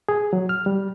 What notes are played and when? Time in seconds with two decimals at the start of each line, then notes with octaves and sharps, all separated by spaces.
0.09 G#4
0.33 F#3
0.49 F6
0.66 G3